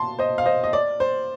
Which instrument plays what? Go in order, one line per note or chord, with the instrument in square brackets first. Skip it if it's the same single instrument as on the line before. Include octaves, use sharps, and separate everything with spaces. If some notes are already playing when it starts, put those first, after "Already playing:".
Already playing: [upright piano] A5 C6
C5 D#5
F5
C5 D#5
D#5
D5
C5